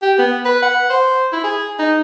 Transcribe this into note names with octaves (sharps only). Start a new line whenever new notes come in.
G4
B3
B4
F#5
C5
E4
G#4
D#4